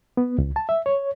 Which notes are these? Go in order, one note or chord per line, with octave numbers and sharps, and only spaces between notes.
B3
C#2
A5
E5
C#5